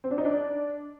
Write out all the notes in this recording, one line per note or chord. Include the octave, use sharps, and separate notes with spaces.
C4
D4
D#4
D4